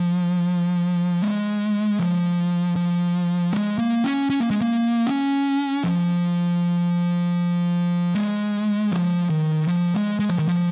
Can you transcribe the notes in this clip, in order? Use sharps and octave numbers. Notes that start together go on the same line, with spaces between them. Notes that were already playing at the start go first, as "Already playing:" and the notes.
Already playing: F3
G#3
F3
F3
G#3
A#3
C#4
C#4
A#3
G#3
A#3
C#4
F3
G#3
F3
D#3
F3
G#3
G#3
F3
D#3
F3